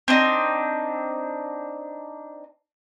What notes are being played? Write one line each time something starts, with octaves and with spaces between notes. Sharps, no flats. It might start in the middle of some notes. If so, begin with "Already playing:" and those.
C4 D4 D#4